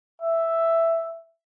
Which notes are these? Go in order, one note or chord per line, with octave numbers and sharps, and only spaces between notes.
E5